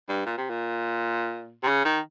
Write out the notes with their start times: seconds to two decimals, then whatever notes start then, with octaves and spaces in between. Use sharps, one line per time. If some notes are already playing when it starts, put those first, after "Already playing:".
0.09 G2
0.26 A#2
0.38 C3
0.50 A#2
1.63 C3
1.68 C#3
1.85 D#3